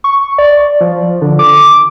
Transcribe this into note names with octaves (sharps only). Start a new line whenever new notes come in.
C#6
D5
F3
D3
D6